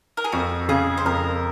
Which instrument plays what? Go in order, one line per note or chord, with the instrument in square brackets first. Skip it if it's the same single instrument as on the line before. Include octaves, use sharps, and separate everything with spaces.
[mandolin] A#4
G#4
[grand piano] F2 [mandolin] F#4
[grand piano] C#3 [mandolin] G#4
[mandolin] C5
[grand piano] F2 [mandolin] A#4